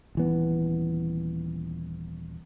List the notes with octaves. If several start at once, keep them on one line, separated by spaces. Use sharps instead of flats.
D#1 E3 B3